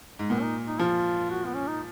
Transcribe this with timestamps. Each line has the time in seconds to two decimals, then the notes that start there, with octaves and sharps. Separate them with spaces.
0.19 G#2
0.29 A#2 B3
0.42 D#4
0.67 D#4
0.79 F3 F4
1.30 F#4
1.45 B3
1.55 C#4
1.67 D#4